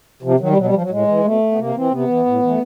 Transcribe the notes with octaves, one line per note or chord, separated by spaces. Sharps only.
C3 F3
D#3 F#3
G3
B2 F#3
G3
F3
F#3
A2 G#3
E3
B2 A3
B3
C3 A#3
E3 C4
C3 B3
E3
A2
E3
A3